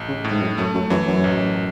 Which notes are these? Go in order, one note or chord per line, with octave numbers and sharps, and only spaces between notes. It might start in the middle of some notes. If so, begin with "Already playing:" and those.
Already playing: A1
C#3
A2
G#2
F#2
F#2 A3
F#2
F#2 E3
F#2
A1